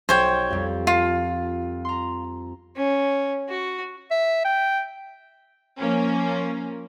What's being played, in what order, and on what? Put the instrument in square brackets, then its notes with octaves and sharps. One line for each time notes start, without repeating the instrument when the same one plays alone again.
[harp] B1 [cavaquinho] C5 C#5 G5
[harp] F2 G3
[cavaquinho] F4 [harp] A5 C7
[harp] A#5 C6
[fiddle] C#4
F#4
[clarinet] E5
G5
[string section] F3 A#3 C#4